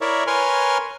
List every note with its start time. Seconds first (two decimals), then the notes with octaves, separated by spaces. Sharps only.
0.01 E4 A#4 C#5 D5 E5
0.27 A#4 B4 C#5 G#5 C6 F6